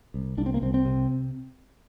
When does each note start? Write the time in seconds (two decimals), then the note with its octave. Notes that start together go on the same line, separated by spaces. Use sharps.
0.14 C2
0.37 C2 D4
0.46 C4
0.54 A#3
0.62 C2 C4
0.74 C4
0.85 C3